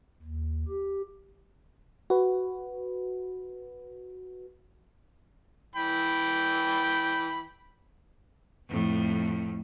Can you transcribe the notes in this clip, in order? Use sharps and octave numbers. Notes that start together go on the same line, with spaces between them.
D#2
G4
F#4 B4
E3 G5 B5
F2 A2